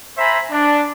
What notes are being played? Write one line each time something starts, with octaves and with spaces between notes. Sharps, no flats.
C5 E5 G#5 A#5 B5
D4